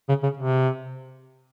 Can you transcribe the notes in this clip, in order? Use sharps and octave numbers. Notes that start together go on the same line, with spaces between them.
C#3
C#3
C3